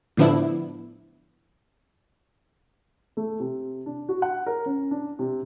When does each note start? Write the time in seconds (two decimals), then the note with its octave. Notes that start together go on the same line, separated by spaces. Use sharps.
0.17 A2 D3 F3 B3 D4 E4
3.17 A3
3.40 C3
3.86 D4
4.09 F#4
4.22 F#5
4.46 A#4
4.66 C#4
4.91 D4
5.19 C3